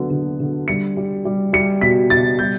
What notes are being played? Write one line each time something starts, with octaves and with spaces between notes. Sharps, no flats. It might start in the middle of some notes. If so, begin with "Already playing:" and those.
Already playing: D3 F#3 B3
D3
D3
G3 C#7
G3
G3
G3 C#7
B2 B6
B2 A6
G3 G6